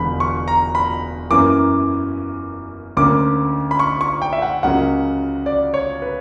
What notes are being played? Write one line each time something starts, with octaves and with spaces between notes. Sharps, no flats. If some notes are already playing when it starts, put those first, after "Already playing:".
Already playing: E1 E2 D3 B5
C#6
A#5
B5
F#2 E3 A#3 C#4 D6
D2 D3 A#3 C#4 D6
B5
C#6
C#6
G5
E5
F#5
C#2 C#3 F#3 A#3 F#5
D5
C#5
B4